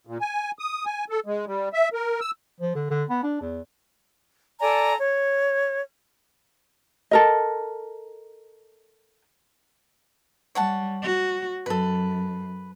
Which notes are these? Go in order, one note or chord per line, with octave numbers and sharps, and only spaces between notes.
A#2
G#5
D#6
G#5
A4
G#3
G3
E5
A#4
E6
F3
D3
D3
B3
D4
E2
A4 D5 G#5 A#5
C#5
A4 A#4 D#5
G3 C#5 F#5 A5
F#4
F#2 A4 B4